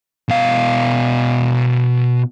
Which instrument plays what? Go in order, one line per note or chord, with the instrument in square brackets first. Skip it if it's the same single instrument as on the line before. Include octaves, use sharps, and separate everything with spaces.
[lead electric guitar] B2 F5